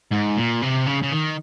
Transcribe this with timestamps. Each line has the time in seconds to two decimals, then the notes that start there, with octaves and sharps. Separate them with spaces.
0.12 G#2
0.38 A#2
0.62 C3
0.87 C#3
1.03 C#3
1.12 D#3